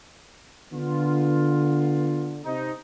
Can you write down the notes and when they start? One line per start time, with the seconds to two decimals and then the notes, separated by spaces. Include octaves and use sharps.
0.73 D3 B3 F4
2.45 C3 C4 D#4